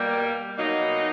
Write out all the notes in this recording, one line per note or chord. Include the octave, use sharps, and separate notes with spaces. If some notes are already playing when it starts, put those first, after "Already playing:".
Already playing: B2 G3 A#3
B2 F#3 A#3 D#4